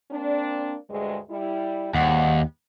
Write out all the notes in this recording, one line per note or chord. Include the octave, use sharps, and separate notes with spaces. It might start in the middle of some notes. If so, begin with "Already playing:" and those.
A#3 C4 D4
D2 G2 G#3
G3 E4
D#2 G#2 G3 F#5